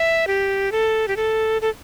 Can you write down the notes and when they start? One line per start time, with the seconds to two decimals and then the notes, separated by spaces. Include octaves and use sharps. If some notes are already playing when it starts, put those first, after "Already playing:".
Already playing: E5
0.27 G4
0.72 A4
1.08 G4
1.17 A4
1.62 A4